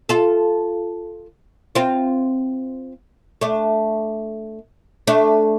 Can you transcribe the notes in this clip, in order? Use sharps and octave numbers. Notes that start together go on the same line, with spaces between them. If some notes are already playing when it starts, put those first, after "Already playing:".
F4 A4
C4 F4
A3 D4
A3 D4